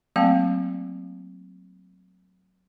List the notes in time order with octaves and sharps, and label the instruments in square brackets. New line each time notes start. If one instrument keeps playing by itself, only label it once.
[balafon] F#3 A3 A#3 C4 F5 A5